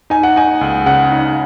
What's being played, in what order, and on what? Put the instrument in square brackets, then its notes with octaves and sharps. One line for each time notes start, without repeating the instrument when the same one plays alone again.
[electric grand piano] D#4 [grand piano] G#5
[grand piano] F#5
[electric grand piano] D#4 [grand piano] G#5
[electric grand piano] C#2
[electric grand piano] C#3 [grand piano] F#5
[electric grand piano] D#4